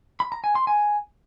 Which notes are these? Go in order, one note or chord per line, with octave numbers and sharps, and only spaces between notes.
B5
A#5
G#5
C6
G#5